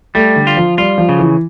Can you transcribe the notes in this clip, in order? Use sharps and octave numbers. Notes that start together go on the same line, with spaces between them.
G3 A3
D3
F4
F3
G3 F4
F3
C#3
E3